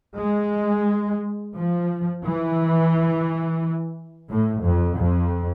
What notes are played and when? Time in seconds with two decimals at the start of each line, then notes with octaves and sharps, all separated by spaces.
0.18 G#3
1.56 F3
2.24 E3
4.30 A2
4.65 F2
4.99 F2